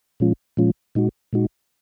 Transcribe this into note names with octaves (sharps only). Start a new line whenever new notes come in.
A#2 F3 G#3 C#4 F4
A#2 F3 G#3 C#4 F4
A#2 G#3 D#4 F#4
A#2 G#3 D#4 F#4